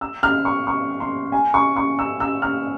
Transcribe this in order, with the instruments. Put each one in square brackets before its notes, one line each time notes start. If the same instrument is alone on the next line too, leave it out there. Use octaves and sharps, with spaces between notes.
[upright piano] E6
F6
C#6
C#6
C6
G#5
C#6
C#6
E6
E6
F6